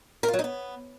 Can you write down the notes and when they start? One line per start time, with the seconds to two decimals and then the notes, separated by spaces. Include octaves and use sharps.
0.23 A#4
0.28 F4
0.34 F#3
0.39 D#4
0.44 B3